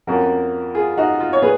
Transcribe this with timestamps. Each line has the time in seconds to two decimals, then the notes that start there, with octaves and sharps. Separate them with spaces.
0.07 F2 F3 A#3 C#4 F#4 A#4
0.75 F4 G#4
0.97 D#4 F#4
1.20 F4
1.33 C#5
1.42 A#2 G#4 B4